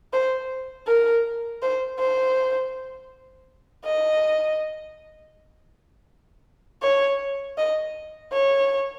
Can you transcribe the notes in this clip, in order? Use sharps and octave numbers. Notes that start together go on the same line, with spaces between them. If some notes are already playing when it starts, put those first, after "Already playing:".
C5
A#4
C5
C5
D#5
C#5
D#5
C#5